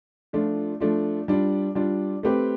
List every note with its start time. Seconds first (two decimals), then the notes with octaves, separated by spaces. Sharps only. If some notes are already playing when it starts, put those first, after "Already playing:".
0.33 F3 A3 D4 F4
0.80 F3 A3 D4 F4
1.28 G3 D4 F4
1.75 G3 D4 F4
2.23 A3 C4 G4 B4